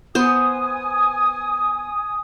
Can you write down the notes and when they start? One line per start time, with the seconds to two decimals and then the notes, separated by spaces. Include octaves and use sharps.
0.15 B3 C5 G#5 D#6